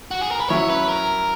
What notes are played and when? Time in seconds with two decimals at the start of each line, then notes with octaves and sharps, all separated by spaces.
0.11 F#4
0.21 G#4
0.31 A#4
0.40 B4
0.50 F#3 C#4 E4 C#5
0.69 B4
0.89 A#4